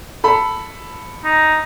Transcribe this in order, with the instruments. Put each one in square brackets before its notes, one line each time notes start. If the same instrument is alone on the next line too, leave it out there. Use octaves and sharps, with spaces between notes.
[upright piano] A4 B5
[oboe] D#4